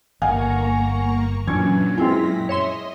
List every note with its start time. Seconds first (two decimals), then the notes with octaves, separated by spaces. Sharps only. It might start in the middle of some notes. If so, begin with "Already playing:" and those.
0.22 G1 A#3 F5 F#5 G#5 A#5 C#6
1.47 F#2 A#2 E3 F#3 C#4 D4 G#6
1.98 A#2 G#3 C4 E4 F4 G#4 A#6 B6
2.49 C#5 D#5 E5 C6